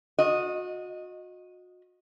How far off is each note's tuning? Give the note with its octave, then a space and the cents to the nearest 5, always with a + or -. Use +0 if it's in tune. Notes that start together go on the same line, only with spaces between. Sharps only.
F#4 -35 D#5 +0